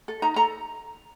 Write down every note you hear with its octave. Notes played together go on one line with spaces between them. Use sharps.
A4
D#4 A#5
A4 A#5